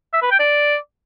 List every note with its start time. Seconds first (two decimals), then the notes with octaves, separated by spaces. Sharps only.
0.14 E5
0.22 B4
0.31 G5
0.39 D5